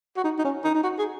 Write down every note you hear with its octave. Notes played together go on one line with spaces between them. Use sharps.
F#4
D#4
D#4
C#4
D#4
D#4
F#4
G#4